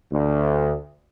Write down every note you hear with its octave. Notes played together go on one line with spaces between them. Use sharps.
D2